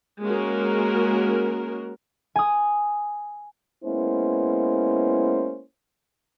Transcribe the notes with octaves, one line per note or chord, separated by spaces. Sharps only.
G#3 A#3 C#4 F#4 A#4
G#5 D#6
G#3 A#3 B3 C#4 E4 C5